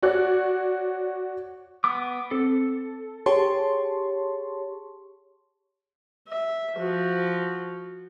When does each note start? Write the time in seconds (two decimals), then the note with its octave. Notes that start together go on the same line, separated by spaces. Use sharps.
0.03 F#4 C#5 D5 F#6
1.84 B3 D6
2.31 C4 A4
3.26 G4 G#4 C#5 A5 C6 C#6
6.28 E5
6.77 F3 F#4